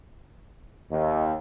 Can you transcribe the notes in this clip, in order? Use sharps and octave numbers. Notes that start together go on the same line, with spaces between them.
D#2 D#5